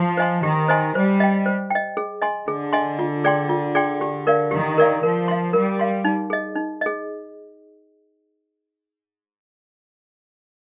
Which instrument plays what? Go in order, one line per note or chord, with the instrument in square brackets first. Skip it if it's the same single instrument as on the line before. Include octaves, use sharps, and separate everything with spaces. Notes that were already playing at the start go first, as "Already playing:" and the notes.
Already playing: [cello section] F3
[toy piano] C5 D#5 G#5 C6
[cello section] D#3 [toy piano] G4
[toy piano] C5 D#5 G#5 C6
[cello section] G3 [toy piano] C5
[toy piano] D#5 G5
C5
D#5 G5
G#4
D#5 G#5 C6
[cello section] D3 [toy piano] G#4
[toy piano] D#5 G#5 C6
F4
G#4 D5 G5 C6
F4
G#4 D5 G5 C6
G4
A#4 D5 F5
[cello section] D#3 [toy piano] G4
[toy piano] A#4 D5 F5
[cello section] F3 [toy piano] A#4
[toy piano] F5 C6
[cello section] G3 [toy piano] A#4
[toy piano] F5 C6
D#4
G#4 D#5
D#4
G#4 D#5